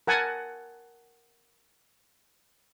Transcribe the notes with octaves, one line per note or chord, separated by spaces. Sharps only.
A#4 F#5 G#5 A5